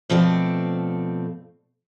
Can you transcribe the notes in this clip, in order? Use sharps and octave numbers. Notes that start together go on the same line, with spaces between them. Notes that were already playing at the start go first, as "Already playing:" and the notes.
B2 F3 A3 C4 A4 D5